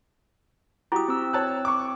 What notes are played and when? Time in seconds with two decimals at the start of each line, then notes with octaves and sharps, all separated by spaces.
0.92 E4 F#4 G4 D#6
1.08 C4 E6
1.33 C#5 A5 F#6
1.65 C#6 D6